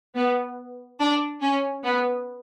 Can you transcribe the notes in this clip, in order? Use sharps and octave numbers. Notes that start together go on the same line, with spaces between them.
B3
D4
C#4
B3